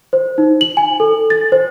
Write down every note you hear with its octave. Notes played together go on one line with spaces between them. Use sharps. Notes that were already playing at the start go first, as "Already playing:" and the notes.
C5
D#4
F#7
G#5
A4
A6
C5